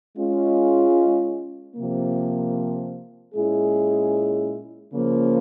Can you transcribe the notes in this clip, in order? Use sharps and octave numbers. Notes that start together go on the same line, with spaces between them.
G#3 C#4 F4
C3 F3 A#3
A#2 G#3 C#4 E4 G#4
C#3 F3 A#3